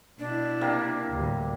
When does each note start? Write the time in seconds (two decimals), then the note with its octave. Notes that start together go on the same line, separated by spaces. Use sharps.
0.19 B2 D4 E4
0.61 C3 A#3
1.11 D2 A2 G3